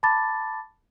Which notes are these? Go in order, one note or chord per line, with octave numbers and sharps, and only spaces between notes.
A5 B5 D6 A6